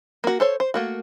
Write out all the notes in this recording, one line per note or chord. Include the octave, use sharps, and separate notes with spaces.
A#3 F#4
A4 C5 C#5
C5
A3 A#3 F#4